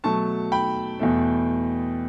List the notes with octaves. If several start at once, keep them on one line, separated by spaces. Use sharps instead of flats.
B2 F#3 A3 A5 C#6
G5 B5
E2 B2 A3